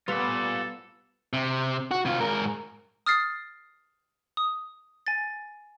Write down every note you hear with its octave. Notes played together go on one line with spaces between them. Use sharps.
G3 B3 F4 A4 D5
C3
F#4
C3 F4
G#2 A#4
D#6 F6 A6 C7
D#6
G#5 A6